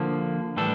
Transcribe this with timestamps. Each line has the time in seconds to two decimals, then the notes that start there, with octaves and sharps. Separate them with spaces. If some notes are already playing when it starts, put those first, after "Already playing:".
Already playing: D3 F3 A#3
0.57 A2 E3 G3 D4 A4